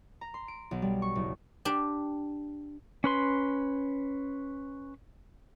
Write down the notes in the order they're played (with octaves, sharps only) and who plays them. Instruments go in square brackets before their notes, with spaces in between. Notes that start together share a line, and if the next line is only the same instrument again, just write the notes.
[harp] A#5
C6
D7
B1
G3
C#6
F#1
[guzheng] D4 G4
[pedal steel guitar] C#4 B4 C6